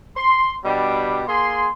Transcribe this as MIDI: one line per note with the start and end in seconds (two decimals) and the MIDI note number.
0.17 0.54 84
0.64 1.22 47
0.64 1.22 55
0.64 1.22 62
0.64 1.22 67
1.28 1.69 58
1.28 1.69 68
1.28 1.69 84